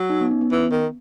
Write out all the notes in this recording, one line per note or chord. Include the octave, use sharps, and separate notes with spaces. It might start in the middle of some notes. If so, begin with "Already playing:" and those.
Already playing: F#3
D#4
B3
C#4
B3
E3
D#3